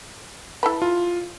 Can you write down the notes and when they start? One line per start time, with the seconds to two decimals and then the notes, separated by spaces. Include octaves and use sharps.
0.63 E4 A4 B4
0.82 F4